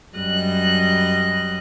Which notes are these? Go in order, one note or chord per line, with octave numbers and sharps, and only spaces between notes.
F#2 G3 D#5 F#6